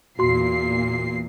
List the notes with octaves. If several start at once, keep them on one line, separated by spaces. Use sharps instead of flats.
E2 A#2 F#4 C6 C7